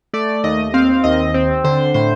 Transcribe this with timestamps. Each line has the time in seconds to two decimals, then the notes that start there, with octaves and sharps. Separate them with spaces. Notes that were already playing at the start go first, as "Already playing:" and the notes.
0.13 A3 D5
0.44 D#2 D#5
0.74 C4 F5
1.04 D#2 D#5
1.34 C4
1.64 D3 C5
1.94 A2 C5